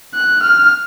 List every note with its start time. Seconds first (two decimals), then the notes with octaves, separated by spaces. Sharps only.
0.15 F#6
0.44 F6